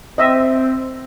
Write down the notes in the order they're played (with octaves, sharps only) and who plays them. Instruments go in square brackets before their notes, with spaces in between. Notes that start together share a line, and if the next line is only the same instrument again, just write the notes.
[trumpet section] C4 [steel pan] D#5 E5